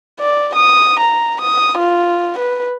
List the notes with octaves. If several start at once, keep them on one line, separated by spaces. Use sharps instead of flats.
D5
D#6
A#5
D#6
F4
B4